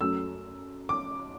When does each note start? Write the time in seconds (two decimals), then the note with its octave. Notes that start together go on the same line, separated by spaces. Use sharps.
0.01 F#2 F#3 A3 E6
0.89 D6